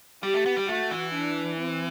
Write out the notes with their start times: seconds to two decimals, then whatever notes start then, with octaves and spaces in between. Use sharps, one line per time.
0.23 G3 G4
0.34 A3
0.46 B3
0.57 G3
0.68 A3 F#4
0.91 E3
1.14 D4
1.60 C4